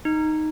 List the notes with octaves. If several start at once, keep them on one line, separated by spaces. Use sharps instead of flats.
D#4